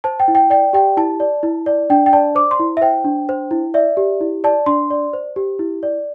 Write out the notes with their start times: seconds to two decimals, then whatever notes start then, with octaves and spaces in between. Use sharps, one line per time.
0.04 C5 A5
0.20 G5
0.28 E4
0.35 G5
0.50 D5 G5
0.73 G4 G5
0.97 E4 A5
1.20 D5
1.43 E4
1.66 D5
1.90 D4 G5
2.06 G5
2.13 D5 A5
2.35 C5 D6
2.51 C6
2.59 E4
2.77 E5
2.81 C5 G5
3.05 D4
3.29 C5
3.51 E4
3.74 D5 E5
3.97 G4
4.21 E4
4.44 D5 A5
4.66 D4 C6
4.90 D5
5.13 C5
5.36 G4
5.59 E4
5.83 D5